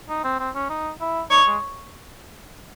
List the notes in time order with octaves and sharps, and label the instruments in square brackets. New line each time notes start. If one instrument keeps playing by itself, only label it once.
[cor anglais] D#4
C4
C4
C#4
D#4
E4
[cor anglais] D#4 [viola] C#5
[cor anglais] G#3